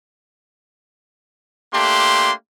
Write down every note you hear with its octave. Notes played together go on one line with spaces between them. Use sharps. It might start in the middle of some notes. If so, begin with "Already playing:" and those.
A3 A#3 D4 G4 C6